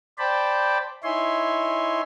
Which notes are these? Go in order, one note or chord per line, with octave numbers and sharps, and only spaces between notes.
C5 D5 G5 A5 B5
D#4 E4 C#5 E5 G#5 C6